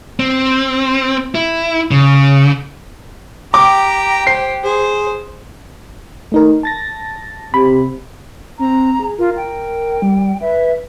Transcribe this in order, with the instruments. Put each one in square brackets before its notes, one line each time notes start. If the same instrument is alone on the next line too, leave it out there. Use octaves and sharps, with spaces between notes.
[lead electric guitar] C4
E4
C#3
[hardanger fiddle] G4 G5 [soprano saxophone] A#5 [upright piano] D6
[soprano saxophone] C5 [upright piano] C7
[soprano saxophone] G#4 [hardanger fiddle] C5
[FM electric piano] A3 D#4 A#4
A5 A6 A#6
[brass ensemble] C3 [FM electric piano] B5
[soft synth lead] C4 [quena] A#5
[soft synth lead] G#4
[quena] F4 [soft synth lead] A#4
[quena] G5
[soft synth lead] G3
[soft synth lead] B4 [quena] E5